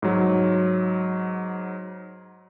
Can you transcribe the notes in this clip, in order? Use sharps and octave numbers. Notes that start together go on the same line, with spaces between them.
G#2 F#3